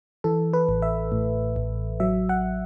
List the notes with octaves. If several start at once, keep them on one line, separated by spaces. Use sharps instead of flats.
E3 A4
B4
A1
E5
A2
A1
F#3 E5
F#5